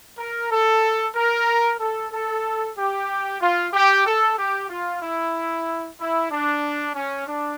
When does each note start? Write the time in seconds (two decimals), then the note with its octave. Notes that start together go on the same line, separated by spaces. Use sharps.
0.18 A#4
0.50 A4
1.15 A#4
1.80 A4
2.12 A4
2.76 G4
3.40 F4
3.73 G4
4.05 A4
4.37 G4
4.69 F4
5.02 E4
5.99 E4
6.31 D4
6.95 C#4
7.27 D4